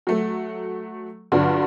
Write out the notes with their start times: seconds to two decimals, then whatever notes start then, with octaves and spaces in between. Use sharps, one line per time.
0.07 F#3 A3
1.32 G2 D3 F#3 D4 F4 F#4